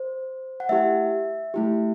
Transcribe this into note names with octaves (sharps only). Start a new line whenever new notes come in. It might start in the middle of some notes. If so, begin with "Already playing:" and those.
Already playing: C5
F#5
A3 E4 G4 E5
A3 E4 G4